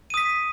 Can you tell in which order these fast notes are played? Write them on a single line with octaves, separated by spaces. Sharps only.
D#7 D#6 B6